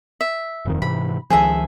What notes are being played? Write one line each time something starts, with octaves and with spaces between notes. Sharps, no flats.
E5
D#1 F2 D#3
G#2 C3 E3 B5
C#2 D#3 F3 G#4 A4 E5